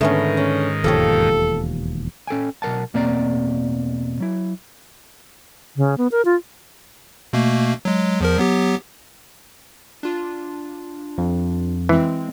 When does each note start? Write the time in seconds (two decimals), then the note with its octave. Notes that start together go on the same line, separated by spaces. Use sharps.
0.01 G#2 D3 D#3 A3 B3 C#4
0.37 C#4 A#5
0.84 E1 D#2 F3 G4 A4 C#5
2.27 C#4 A4 G5 G#5
2.62 B1 F#3 A#4 F#5 A5
2.94 E2 B2 A#3 C4 D5 A#5
4.20 F#3 E4
5.77 C#3
5.98 B3
6.12 A#4
6.25 F4
7.33 B2 A3 A#3
7.85 F#3 G#3
8.21 E2 F3 A#4
8.38 F#3 B3 G4
10.03 D4 F4
11.18 F2
11.89 E3 G#3 C4